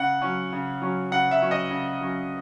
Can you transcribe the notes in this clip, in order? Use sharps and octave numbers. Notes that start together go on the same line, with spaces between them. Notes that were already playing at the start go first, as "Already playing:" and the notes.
Already playing: C#3 F#5
F#3 C#4
C#3
F#3 C#4
C#3 F#5
E5
F#3 C#4
D#5
C#3
F#3 C#4